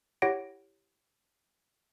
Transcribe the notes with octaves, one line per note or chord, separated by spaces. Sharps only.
E4 G4 C#5 F#5 A#6 D7